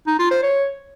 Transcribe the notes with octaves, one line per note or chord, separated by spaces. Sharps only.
D#4
F4
C5
C#5